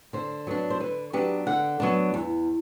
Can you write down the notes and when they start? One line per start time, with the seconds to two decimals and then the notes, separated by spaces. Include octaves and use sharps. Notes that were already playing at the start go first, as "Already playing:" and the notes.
0.13 D3 C5
0.47 F#3 B3 D4
0.70 C5
0.80 D3 B4
1.13 F#3 B3 D4 G4
1.47 D3 F#5
1.80 F#3 B3 D4
2.14 E2